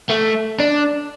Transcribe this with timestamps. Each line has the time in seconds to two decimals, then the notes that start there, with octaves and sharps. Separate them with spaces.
0.10 A3
0.60 D4